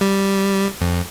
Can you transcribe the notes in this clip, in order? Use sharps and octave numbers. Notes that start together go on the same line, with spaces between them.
G3
F2